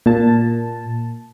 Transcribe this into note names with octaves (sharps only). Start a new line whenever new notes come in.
A#2 A5